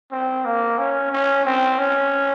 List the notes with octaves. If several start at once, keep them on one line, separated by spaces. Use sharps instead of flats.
C4
A#3
C#4
C#4
C4
C#4